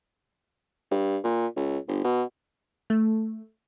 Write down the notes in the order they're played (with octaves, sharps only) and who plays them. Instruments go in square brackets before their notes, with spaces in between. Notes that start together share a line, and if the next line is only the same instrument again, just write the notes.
[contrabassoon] G2
A#2
C#2
G1
B2
[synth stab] A3